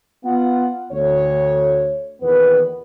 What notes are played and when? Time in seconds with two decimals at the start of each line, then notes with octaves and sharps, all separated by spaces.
0.24 B3 F4 F#5
0.92 D2 C#5
2.22 E2 A#2 D#3 B3 B4